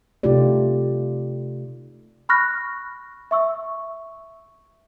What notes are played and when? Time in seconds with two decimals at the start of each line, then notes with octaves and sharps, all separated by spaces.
0.23 C3 A3 D#4 F4 G4 D5
2.29 B5 C#6 F6 F#6 A#6
3.31 E5 C#6 E6